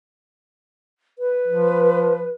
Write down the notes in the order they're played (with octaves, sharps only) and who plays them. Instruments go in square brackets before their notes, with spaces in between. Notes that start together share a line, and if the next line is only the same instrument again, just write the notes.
[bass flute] B4
[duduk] F3